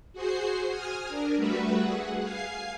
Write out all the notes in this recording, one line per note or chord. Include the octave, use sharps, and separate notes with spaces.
F#4 G#4 C5 C7
G#5 D#6 F6
D4 A#4
G3 A3 F#4 B4 E5
G#4 F#5
F5 G#5 C7